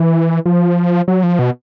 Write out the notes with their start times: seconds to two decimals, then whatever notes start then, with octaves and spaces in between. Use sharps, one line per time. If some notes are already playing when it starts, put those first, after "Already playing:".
Already playing: E3
0.46 F3
1.08 F#3
1.23 F3
1.39 B2